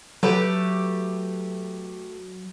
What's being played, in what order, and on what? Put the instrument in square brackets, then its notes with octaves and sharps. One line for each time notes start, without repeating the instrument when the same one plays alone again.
[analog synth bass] F#3 [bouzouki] A3 G4 B4